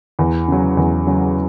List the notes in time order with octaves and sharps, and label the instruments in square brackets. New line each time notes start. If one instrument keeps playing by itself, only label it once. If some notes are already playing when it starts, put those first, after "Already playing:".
[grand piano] E2
C#3 F#3
E2
C#3 F#3